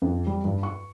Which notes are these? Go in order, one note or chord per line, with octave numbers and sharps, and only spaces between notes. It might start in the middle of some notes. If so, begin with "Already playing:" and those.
F2
G3
G2
C#6